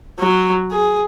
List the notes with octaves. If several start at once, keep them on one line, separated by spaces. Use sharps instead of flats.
F#3
G#4